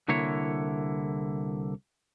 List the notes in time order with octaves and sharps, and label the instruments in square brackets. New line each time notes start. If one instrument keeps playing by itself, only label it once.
[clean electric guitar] C2 D3 A#3 E4 C#5